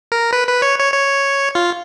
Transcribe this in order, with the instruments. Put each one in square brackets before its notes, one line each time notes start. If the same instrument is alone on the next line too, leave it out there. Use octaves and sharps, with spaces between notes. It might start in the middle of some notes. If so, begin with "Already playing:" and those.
[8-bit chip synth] A#4
B4
B4
C#5
C#5
C#5
F4